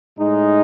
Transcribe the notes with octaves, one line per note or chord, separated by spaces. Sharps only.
A2 G#3 D#4